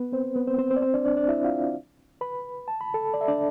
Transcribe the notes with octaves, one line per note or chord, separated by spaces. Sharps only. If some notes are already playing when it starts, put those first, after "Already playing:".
Already playing: B3 B4
C4 C5
B3 B4
C4 C5
C4 C5
C4 C5
D5
C4 C5
D4 D5
D4 D5
D4 D5
E4 E5
F4 F5
B4 B5
A5
B5
A4 A5
D5
E5
D4 D5